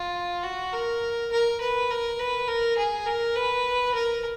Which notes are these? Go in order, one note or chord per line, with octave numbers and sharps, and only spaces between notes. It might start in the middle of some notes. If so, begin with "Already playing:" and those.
Already playing: F4
F#4
A#4
A#4
B4
A#4
B4
A#4
G#4
A#4
B4
A#4